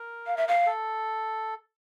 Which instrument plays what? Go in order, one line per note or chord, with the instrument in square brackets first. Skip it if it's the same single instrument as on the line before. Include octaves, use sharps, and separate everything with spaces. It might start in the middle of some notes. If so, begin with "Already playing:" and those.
Already playing: [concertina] A#4
[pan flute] F5
E5
F5
[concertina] A4